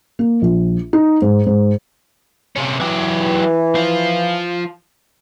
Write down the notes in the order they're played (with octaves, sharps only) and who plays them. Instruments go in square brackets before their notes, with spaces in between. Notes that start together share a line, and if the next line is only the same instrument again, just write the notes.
[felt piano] A#3
A#1
D#4
G#2
G#2
[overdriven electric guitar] C3 C#4
[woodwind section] E3 [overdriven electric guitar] F#3 G4
[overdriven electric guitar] F3 F4